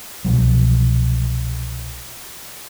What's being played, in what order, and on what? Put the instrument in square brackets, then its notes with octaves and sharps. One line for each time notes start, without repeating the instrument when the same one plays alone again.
[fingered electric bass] C2 B2 F3 F#3